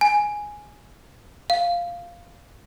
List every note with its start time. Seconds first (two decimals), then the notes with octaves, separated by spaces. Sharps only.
0.01 G#5
1.50 F5